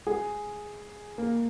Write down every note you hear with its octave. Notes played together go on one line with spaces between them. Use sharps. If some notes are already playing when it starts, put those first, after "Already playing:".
G#4
A#3